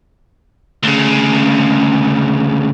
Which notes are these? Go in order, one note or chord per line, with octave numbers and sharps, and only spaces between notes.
D2 C#3